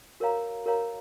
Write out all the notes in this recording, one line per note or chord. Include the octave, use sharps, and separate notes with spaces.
F#4 A#4 C#5 F5 A#5
F#4 A#4 C#5 F5 A#5